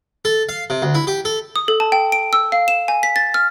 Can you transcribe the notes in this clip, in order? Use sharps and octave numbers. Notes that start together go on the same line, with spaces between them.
A4
F5
C3
D2
E4
G4
A4
D#6
A4
A5
G5
D7
E6
F5
E7
G#5
B6
A6
F6